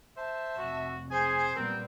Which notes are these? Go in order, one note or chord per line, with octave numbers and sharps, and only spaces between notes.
C5 E5 A5
F1 F#4
G#4 C5 G#5
A#2 G3 B3 C4 A#4